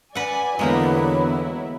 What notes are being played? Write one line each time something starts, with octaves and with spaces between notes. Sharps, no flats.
B4 D5 F#5 G#5
E2 D3 F#3 G#3 A#3 B3 E4 G4